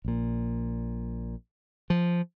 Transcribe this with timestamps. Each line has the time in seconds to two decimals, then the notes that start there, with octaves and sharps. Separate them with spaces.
0.05 A#1 A#2
1.90 F3